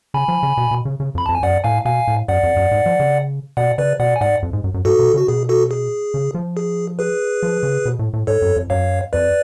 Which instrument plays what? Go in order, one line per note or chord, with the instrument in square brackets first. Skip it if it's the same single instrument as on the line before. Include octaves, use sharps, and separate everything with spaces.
[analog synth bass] C#3 [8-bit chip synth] G#5 B5
[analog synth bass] F3
C#3
B2
B2
C#3
C#3
[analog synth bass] F2 [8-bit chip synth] B5
[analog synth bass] F2 [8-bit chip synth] A5
[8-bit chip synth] G#5
[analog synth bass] F#2 [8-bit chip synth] D5 F#5
[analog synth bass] A2 [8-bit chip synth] F5 G#5
[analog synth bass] B2 [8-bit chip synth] F5 G#5
[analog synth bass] A2
[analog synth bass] F#2 [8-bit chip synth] D5 F#5
[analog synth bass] F2
F#2
G#2
F3
C#3
[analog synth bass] B2 [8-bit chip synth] D5 F#5
[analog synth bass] C#3 [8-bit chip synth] B4 D5
[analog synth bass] B2 [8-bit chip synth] D5 F#5
[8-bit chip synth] G#5
[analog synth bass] G#2 [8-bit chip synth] D5 F#5
[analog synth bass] F2
G#2
F#2
F#2
[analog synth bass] G#2 [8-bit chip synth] F#4 A4
[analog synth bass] B2
[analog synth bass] C#3 [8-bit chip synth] F#4
[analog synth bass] B2 [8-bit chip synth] G#4
[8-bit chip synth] F#4 A4
G#4
[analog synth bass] C#3
F3
[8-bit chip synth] G#4
G#4 B4
[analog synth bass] F3
C#3
B2
A2
A2
[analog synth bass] G#2 [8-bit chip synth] A4 C#5
[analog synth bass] F#2
F2
[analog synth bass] F#2 [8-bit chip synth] C#5 F5
[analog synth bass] F2 [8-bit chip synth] B4 D5